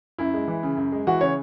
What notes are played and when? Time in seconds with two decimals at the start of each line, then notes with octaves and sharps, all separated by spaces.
0.18 F#2 E4
0.34 G#3
0.48 E3
0.63 C#3
0.77 F#2
0.92 G#3
1.07 E3 F#4
1.21 C#3 C#5